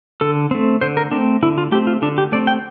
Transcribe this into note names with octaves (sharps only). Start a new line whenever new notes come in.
D3 A4
A3 C4
D3 C5
A#4
A3 C4 D4
D3 E4
F4
A3 C4 G4
F4
D3 D4
G4
A3 C4 D5
G5